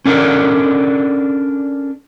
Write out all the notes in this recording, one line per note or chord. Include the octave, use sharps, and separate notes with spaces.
C#4 D4 A4 A#4 D5